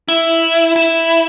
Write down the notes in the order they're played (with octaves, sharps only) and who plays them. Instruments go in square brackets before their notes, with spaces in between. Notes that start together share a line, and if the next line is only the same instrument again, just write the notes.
[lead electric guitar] E4
E4